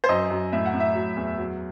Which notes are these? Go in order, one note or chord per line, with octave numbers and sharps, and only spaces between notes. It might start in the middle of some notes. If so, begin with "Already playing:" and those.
C5
F#2 D#5
F#2
A2 E5
F#5
A2
E5
F#3
E2
F#3